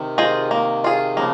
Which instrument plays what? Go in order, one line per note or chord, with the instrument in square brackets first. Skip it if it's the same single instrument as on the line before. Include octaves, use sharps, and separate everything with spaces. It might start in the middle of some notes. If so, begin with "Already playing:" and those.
Already playing: [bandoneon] C3 D#3
[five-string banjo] F4 G#4 C5 D#5
A#3
F4 G#4
[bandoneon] C#3 F3 [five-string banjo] A#3